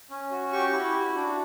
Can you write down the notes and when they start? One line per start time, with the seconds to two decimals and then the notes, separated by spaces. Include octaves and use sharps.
0.10 C#4
0.31 F#4
0.53 G4 C#6
0.73 E4
0.94 F#4
1.15 D4